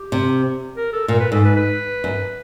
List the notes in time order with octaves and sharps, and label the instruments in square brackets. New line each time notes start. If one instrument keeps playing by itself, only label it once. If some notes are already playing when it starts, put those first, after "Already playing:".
Already playing: [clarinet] G4
[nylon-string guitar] C3
[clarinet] A#4
A4
[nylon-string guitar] A#2 [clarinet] A#4
[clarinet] B4
[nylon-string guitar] G#2 [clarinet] A4
[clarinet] B4
B4
[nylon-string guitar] F#2